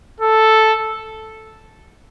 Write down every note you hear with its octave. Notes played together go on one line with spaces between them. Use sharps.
A4